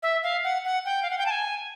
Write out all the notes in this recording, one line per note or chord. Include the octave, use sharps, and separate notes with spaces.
E5
F5
F#5
F#5
G5
F5
F#5
G5
A5
G#5